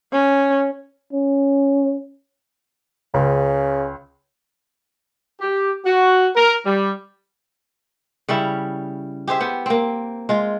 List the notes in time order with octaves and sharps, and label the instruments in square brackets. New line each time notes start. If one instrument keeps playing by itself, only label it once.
[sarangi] C#4
[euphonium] C#4
[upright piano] C#2 [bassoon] C#3
[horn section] G4
F#4
A#4
G3
[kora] C#3 G3 C#4 E4
G4 G#4 C5 E5
B3 G4
A#3 C4
G#3 F4